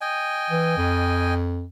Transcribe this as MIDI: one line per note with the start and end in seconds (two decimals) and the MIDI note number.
0.01 1.34 75
0.01 1.34 79
0.01 1.34 80
0.50 0.73 52
0.78 1.65 41